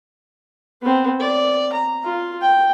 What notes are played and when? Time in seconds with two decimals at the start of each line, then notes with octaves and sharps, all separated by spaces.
0.82 B3 C4
1.20 D5
1.73 A#5
2.04 F4
2.41 G5